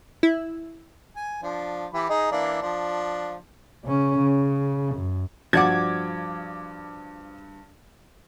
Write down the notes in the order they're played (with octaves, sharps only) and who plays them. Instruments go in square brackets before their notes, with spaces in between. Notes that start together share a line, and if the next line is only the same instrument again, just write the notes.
[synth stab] E4
[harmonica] G#5
F3 D4
E3 G4 B5
D#4 G#4 D#5
E3 A#3 D4
F3 D4
[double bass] C#3 C#4
C#3
F#2
[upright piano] G2 [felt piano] F3 [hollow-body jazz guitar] F#4 D5 F#5 [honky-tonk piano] D6 G#6